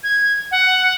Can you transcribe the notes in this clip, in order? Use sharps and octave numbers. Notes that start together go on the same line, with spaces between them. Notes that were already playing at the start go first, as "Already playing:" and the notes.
G#6
F#5